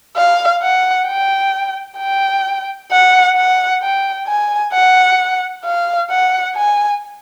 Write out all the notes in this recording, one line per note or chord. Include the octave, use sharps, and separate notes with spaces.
F5
F#5
G5
G5
F#5
F#5
G5
G#5
F#5
F5
F#5
G#5